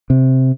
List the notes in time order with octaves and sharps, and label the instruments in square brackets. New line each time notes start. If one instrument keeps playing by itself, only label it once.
[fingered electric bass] C3